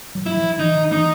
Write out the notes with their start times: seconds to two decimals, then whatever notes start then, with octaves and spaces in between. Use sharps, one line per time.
0.15 F#3
0.26 E4
0.37 F3
0.59 E3 D#4
0.75 D#3
0.92 E3 D#4